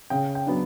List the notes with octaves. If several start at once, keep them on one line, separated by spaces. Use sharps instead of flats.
C#3 G5
G5
F#3 B3 D4